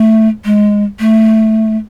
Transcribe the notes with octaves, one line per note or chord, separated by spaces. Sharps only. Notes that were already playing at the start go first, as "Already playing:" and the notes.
Already playing: A3
G#3
A3